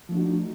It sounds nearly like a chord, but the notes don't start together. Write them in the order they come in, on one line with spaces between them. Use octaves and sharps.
F3 A3 D4 F#4 D#4